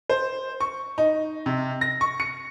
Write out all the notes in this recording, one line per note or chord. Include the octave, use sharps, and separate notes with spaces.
C5
C#6
D#4
C3
A#6
C#6
C#7